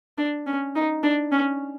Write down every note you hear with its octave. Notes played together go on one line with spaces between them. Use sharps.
D4
C#4
D#4
D4
C#4